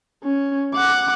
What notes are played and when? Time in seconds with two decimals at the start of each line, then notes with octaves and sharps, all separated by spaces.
0.23 C#4
0.74 F#5 D6